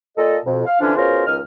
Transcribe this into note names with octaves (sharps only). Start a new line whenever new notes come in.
A#2 A4 D#5
F2 B2
F5
D3 E3 F3 C#4 D4
B2 C#4 F4 G#4 A#4 C5
C#2 D#3 D#5 F6